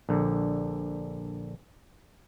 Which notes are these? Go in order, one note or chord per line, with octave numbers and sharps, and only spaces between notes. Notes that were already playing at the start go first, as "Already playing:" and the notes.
A#1 D3